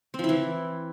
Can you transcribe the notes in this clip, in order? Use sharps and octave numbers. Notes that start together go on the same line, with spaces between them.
C4
F3
E4
E3